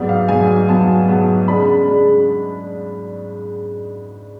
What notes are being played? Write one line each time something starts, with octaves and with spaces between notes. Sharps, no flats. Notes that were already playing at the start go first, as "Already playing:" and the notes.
Already playing: G#2 F#3 B3 D5
F5
G#2 F#3 B3 G#5
G#2 F#3 B3 A5
G#2 F#3 B3
C#3 G#3 D4 B5
C#3 G#3 D4